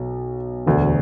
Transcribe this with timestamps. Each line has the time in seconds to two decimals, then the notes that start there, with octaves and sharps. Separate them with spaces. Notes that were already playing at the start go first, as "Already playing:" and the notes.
Already playing: B1 B2
0.66 E1 D2 D3